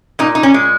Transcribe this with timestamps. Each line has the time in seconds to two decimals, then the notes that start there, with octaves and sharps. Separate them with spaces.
0.19 A#2 D#4
0.35 D#4
0.43 C#4
0.54 G#3